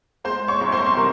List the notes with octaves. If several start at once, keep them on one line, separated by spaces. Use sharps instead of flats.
G#3 C5 C6
C#5 C#6
C2
C5 C6
C6
C3 A#4